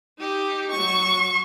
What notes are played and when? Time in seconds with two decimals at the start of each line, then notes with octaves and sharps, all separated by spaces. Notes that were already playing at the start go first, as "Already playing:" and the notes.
0.18 D#4 G4
0.71 F#3 C#6